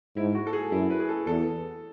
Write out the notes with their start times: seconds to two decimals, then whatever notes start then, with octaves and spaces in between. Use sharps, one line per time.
0.16 G#2 E4
0.35 F#4
0.47 A4
0.53 G#4
0.72 F#2 E4
0.90 B4
1.00 G#4
1.09 A4
1.27 E2 A4